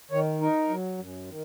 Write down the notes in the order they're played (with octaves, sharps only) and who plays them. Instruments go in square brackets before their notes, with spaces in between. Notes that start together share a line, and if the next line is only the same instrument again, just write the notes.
[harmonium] D#3 C#5
D#4 A#4
F#3
F#2
D#3